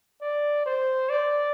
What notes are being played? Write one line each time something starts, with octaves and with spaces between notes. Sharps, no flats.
D5
C5
D5